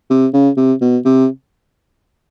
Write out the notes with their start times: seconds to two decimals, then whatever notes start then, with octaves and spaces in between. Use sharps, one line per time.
0.10 C3
0.33 C#3
0.57 C3
0.81 B2
1.05 C3